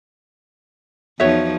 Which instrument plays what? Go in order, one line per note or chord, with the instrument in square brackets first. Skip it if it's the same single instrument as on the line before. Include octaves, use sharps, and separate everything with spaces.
[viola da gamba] E2 F3 D#4 [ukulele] F#4 C#5 E5